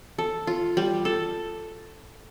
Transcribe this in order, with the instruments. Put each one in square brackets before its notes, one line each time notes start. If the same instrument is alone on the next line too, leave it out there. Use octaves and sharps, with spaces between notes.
[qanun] A4
F4
G3
A4